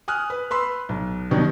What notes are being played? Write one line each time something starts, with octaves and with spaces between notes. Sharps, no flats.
G#5 D#6 F6 F#6
B4
B4 B5 C6 E6
B1
F#2 B2 D#3 F#3 G3